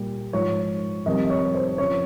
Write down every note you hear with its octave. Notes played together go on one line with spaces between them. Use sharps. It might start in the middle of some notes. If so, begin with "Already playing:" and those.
Already playing: A#2 G3
G#2 F3 C#5
F2 C3 D#3 G3 D#5
C#5
C5
F2 C#3 F3 C#5